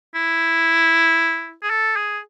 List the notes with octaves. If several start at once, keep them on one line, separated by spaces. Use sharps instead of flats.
E4
G#4
A4
G#4